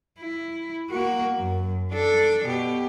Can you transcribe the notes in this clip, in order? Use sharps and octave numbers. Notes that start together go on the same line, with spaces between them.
E4
A#3 F#4
F#2
D4 A4
B2 G4